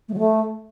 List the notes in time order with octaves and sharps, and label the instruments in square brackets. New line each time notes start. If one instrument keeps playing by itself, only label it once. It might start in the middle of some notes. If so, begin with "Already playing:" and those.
[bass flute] A3
F#3
A3